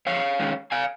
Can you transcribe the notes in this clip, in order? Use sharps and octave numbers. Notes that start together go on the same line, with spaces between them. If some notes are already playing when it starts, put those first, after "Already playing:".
F2 C#5 F5
D#3 G#3 C#4
F5 G#5